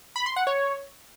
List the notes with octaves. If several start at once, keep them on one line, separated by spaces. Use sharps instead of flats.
B5
C6
F#5
C#5